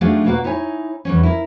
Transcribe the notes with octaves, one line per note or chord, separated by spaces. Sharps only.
F#3 A3 D4 D#4 F4 G#4
B2 A#3 F#4 D5
D#4 E4 C#5 G#5
E2 G3 C#4
E4 A#4